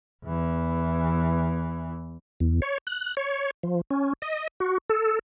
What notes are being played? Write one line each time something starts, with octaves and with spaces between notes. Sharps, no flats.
E2 E3
E2
C#5
F#6
C#5
F3
C#4
D#5
F#4
A4